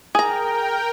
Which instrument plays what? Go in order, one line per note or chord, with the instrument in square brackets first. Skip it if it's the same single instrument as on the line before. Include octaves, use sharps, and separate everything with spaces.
[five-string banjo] G#4 A#5 [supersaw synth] A#4 G5